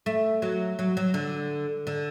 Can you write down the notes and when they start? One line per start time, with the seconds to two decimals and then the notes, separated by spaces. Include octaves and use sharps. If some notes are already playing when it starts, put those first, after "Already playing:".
0.06 A3
0.42 F#3
0.79 F#3
0.97 F#3
1.14 D3
1.87 D3